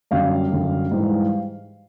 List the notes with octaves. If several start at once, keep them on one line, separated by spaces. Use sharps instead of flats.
F#2 D3 G3 F5
F#2 D3 G3
G#2 E3 G3